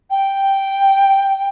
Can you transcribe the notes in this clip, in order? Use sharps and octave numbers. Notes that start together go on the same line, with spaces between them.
G5